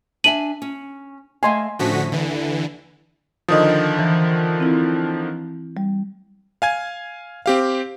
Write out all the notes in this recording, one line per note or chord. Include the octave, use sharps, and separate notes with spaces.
D4 E5 G#5 D#7 F#7
C#4
A3 D#5 F5 G#5 C6
A2 D3 F3 C#4 F#4 B6
D#2 D3 E3
D3 D#3 F3 D#5 D#6
E3
C4 E4
G3
F5 G#5 G#6
C4 G4 F5